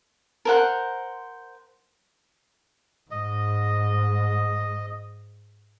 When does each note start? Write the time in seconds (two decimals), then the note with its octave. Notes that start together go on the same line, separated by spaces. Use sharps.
0.45 A#4 C5 F#5
3.11 G#2 D#5